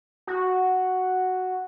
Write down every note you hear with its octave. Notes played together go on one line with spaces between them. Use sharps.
F#4